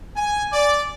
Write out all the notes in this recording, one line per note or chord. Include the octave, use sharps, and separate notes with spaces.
G#5
D5